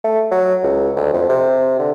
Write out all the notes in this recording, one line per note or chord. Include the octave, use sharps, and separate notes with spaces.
A3
F#3
C#2
D2
F2
C3
D3